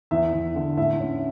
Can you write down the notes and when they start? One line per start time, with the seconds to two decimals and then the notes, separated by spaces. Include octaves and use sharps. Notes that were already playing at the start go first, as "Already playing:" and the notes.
0.11 E2 E5
0.33 E2
0.55 D3
0.77 A2 E5
1.00 C#4